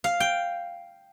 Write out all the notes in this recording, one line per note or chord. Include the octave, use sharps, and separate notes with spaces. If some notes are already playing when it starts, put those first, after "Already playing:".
F5
G5